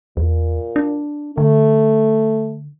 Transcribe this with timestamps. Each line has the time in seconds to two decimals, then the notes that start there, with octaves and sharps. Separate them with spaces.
0.17 E2 A#2
0.76 D4
1.38 D3 A3